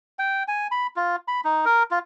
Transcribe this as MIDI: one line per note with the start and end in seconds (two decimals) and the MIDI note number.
0.19 0.43 79
0.48 0.67 80
0.72 0.87 83
0.96 1.16 65
1.28 1.41 83
1.45 1.65 63
1.65 1.83 70
1.91 1.99 65